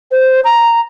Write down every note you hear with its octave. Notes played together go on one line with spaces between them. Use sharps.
C5
A#5